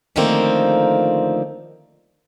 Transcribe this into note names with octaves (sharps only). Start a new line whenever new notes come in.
D3 D#3 F3 A3 A#3 C4